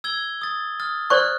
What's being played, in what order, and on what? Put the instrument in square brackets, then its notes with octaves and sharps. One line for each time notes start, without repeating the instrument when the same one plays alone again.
[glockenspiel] E6 G#6 G7
D#6 A6
D#6 F6 A6
[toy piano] C5 D5 C#6 [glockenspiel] F6 F#6